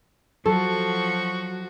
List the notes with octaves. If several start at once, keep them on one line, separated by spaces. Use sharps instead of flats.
F3 F#3 F#4 A4 C#6